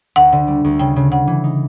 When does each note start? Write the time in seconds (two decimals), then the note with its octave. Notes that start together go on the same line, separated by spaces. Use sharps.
0.16 D2 F#5
0.32 D3
0.48 G3
0.64 D2
0.79 C#3 G5
0.96 C#3
1.12 C#3 F#5
1.27 E3
1.44 D#4